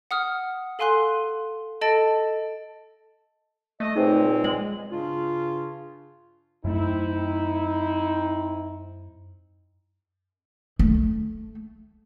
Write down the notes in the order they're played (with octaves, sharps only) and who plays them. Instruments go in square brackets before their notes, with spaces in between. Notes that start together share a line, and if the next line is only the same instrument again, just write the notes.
[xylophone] F#5 D#6 F6
A4 F5 G#5 C6 F#6 G7
A4 D#5 A5 A6 D7
[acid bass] A3 [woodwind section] D#5
[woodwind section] C#2 A#2 C4 [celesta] D#4 G#4 C5
[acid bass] G#3 [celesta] F#7
[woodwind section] G2 C#3 D4 F4
[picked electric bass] F#2 A3 [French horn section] C4 D#4 E4
[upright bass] A3